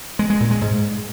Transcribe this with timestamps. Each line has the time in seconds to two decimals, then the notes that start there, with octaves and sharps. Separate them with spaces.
0.19 G#3
0.30 G#3
0.40 A#2
0.51 G#3
0.62 G#2